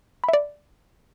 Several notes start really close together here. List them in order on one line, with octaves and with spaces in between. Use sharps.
B5 E5 D5